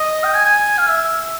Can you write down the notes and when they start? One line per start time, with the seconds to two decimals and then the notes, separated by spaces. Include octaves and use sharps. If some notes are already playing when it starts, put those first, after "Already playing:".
Already playing: D#5
0.24 G5
0.34 G#5
0.45 G#5
0.78 F5
0.88 E5